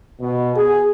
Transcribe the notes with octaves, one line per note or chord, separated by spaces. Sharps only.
B2
G#4